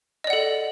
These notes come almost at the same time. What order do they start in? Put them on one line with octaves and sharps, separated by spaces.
D#5 D5 F#5 A4